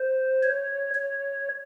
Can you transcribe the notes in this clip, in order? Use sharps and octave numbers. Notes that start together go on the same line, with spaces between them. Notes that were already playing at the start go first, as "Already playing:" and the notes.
Already playing: C5
C#5
C#5